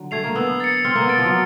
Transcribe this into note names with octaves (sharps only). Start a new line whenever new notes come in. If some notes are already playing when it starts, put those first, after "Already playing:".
Already playing: D3 F#3
A3 G#6 C7 F7
A#3
B3 E6
A6 C#7
C4 F6
A#3
B3
A6 D7
F3
F#3